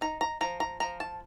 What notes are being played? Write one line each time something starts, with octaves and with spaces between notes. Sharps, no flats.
D#4 A#5
A#5
F3 A#5
A#5
F3 A#5
A5